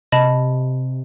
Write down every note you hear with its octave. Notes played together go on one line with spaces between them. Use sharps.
C3 D#5 A5 B5